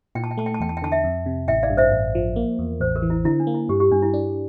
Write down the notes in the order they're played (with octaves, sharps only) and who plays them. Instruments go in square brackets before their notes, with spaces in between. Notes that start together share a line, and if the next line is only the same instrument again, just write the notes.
[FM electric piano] A#2 [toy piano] G5
[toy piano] A5
G5
[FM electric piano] A3 [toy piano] A5
[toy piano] G5
A5
[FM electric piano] E2 [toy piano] G5
[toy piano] A5
G5
[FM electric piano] D3 [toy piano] A5
[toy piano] E5 G5
[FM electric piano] F2
C3
[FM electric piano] A1 [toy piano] E5 G5
[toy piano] D5 F5
[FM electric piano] G2
[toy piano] C5 E5
[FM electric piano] A1
F3
A#3
E2
[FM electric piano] A1 [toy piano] C5
[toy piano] A#4
[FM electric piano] E3
[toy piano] E4
[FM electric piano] D3 [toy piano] E4
[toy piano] D4
[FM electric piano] A#3
[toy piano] E4
[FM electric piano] G2 [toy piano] G4
[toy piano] G4
[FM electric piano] G2 [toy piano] D4
[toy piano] E4
[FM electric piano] D4